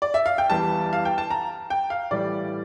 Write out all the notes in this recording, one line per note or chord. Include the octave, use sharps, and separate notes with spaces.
D5
E5
F5
G5
E2 E3 G3 A5
F5
G5
A5
A#5
G5
F5
A2 E3 G3 D5